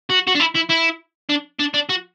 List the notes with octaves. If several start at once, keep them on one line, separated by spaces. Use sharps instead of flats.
F#4
F#4
D4
E4
E4
E4
D4
D4
D4
F#4